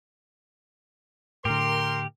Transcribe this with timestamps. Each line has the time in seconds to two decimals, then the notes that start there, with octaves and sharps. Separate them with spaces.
1.45 A2 D3 G4 A#4 C6